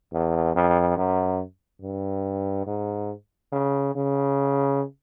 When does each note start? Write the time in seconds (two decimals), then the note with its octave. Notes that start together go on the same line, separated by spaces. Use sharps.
0.13 E2
0.55 F2
0.97 F#2
1.82 G2
2.67 G#2
3.52 C#3
3.95 C#3